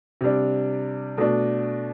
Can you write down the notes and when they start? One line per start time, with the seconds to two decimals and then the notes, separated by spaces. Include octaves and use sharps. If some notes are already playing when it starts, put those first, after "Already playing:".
0.21 C3 G3 D4
1.18 B2 A3 D4